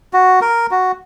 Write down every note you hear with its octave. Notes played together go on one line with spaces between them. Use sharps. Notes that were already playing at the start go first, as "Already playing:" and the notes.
F#4
A#4
F#4